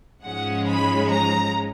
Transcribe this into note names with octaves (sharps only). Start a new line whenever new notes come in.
G#2 F3 G#3 C#4 F#5
B5
A#5